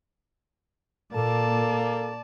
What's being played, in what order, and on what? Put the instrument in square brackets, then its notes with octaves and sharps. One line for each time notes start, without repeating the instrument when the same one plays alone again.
[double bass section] A#2 [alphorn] A#3 [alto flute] A4 [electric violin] D5 A5